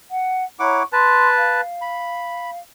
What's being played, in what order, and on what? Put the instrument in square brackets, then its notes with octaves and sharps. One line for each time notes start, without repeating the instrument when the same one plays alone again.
[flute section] F#5
[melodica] E4 F#5 D6 [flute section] C#5 A#5 C#6
[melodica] B4 A5 [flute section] C6
[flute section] F5
[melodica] B5